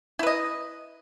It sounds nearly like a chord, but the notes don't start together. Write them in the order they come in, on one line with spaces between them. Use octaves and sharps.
E4 B4 D#5